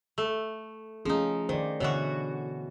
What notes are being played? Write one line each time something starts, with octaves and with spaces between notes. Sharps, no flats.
A3
F3 A3 C#4 D#4 G#4
D#3 C5 D5
B2 D3 E3 F#4 C#5